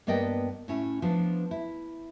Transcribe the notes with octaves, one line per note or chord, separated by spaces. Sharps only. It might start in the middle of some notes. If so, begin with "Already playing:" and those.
G2 A#3 B3 D5 D#5 G5
A2 C#4 E4
F3 B3 D4 F4
E4